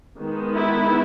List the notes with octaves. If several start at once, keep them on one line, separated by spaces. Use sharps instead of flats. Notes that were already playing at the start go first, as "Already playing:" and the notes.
D#3 G#3 B3
E4